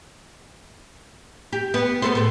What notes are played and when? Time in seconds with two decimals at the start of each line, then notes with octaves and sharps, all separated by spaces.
1.53 G4
1.74 B3
2.02 B3 A4 C5
2.15 A2 A4